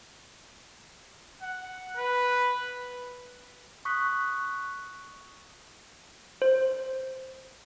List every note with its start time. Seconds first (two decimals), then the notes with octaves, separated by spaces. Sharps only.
1.42 F#5
1.97 B4
3.85 C#6 D#6 F#6 B6
6.42 C5